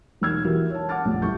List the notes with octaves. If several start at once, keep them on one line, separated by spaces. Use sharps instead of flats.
E1 A#3 D#4 E6 F6 G#6
E3 F#4 G4 A#4
C#5 A5
F#5 A5 D6 F6 A6
F1 A#1
G1 E4 G4 C#6 G6